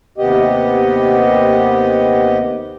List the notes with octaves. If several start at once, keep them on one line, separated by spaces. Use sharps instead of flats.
D#2 C3 B3 G4 D#5